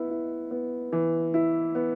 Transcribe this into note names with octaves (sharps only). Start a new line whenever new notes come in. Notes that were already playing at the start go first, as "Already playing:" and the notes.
Already playing: B3 E4
E4
B3
E3
E4
B3